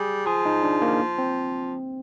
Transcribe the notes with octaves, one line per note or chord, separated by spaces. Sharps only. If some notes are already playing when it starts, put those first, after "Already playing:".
Already playing: G3 G#4
F3 G#4
D#4
D4
A#3
C4